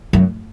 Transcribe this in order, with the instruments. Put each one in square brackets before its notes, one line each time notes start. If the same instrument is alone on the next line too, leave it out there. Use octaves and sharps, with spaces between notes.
[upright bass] F#2